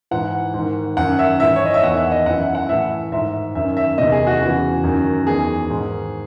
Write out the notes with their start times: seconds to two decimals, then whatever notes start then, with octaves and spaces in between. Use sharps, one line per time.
0.11 G#2 E3 F#5
0.54 G#2 D#3
0.97 F#2 D#3 F#5
1.19 E5
1.40 G#2 E3 E5
1.56 C#5
1.65 D#5
1.74 E5
1.83 E2 D#3 F#5
1.97 E5
2.12 D#5
2.26 F#2 E3 F#5
2.40 E5
2.55 F#5
2.69 A2 E3 E5
3.12 G#2 D#3 E5
3.55 F#2 D#3 E5
3.77 E5
3.98 E2 C3 D#3 D#5
4.12 G#4
4.27 F#4
4.41 E2 C#3 E3
4.84 F#2 D#3
5.27 E2 D#3 G#4
5.70 G#2 D#3